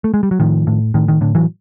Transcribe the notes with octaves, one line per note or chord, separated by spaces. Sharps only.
A3
G#3
G3
F#3
A2 D#3 F3
A2
A2 D#3
D#3
A2 D3
E3 F#3